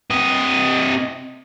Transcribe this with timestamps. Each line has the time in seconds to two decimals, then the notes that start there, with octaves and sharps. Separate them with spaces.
0.10 C3 D#5